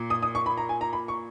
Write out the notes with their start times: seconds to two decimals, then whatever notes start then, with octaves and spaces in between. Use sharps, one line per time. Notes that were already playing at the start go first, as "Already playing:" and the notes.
Already playing: A#2
0.10 D#6
0.23 D#6
0.35 C#6
0.46 B5
0.58 A#5
0.69 G#5
0.81 A#5
0.93 B5
1.08 C#6